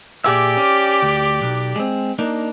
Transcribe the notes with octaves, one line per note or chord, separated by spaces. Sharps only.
A#2 G4 G#4 D5 E5
C#4
D2
B1
G#3 C4
A#3 D4 D#4